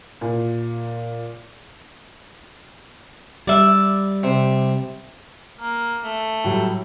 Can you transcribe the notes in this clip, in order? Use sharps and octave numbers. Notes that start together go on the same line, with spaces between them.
A#2
G3 D5 E5
C3
A#3
A3
A2 F#3 G3